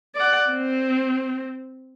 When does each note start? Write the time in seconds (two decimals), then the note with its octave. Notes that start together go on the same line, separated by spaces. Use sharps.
0.15 D5 F#5
0.50 C4